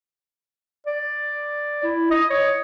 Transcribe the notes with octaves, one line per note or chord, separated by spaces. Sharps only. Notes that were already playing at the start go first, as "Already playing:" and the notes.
D5
E4
D#5
C#5